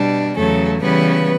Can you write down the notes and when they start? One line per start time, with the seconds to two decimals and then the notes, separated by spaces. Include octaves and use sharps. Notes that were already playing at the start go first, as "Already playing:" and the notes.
Already playing: B2 G3 D4
0.36 E2 C#3 F#3 A3 A4
0.82 C#3 E3 G3 B3 B4